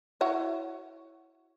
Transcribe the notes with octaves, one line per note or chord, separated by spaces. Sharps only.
E4 F#4 C#5